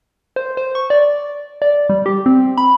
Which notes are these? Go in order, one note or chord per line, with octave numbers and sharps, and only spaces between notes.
C5
C5
C#6
D5
D5
G3
G4
C4
B5